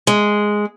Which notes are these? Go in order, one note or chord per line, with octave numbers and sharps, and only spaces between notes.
G#3